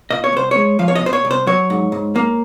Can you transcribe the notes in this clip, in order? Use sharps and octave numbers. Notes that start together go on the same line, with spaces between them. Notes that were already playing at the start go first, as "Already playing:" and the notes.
A#2 D#5
C#5
C2 C5
G#3 C#5
F3 F5
C#5
D#5
A#2
C5
C#5
C2
C5
F#3 C#5
G#2
G#2
A#3